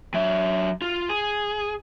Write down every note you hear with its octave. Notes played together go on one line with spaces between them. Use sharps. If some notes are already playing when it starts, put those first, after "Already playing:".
F#3 E5
F4
G#4